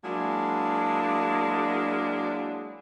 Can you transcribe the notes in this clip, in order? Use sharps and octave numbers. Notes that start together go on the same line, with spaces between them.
F#3 G#3 A#3 D4 E4 G#4